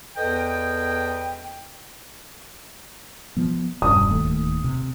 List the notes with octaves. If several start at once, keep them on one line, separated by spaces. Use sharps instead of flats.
E2 A4 B4 D#5 G5
F3 B3
E1 G2 D#6
D1 D#2 A3
C3